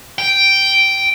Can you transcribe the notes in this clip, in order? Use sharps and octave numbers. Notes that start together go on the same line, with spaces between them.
G5